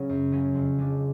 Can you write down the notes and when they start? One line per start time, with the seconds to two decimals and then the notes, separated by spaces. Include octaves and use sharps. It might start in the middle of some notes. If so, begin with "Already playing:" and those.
Already playing: C#3 F#3 C#4
0.09 F#2
0.32 C#3 F#3 C#4
0.54 F2
0.78 C#3 G#3 D4